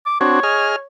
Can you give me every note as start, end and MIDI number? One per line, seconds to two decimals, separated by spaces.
0.06 0.16 86
0.21 0.40 60
0.21 0.40 62
0.21 0.40 66
0.21 0.87 73
0.43 0.76 68
0.43 0.76 75
0.43 0.76 89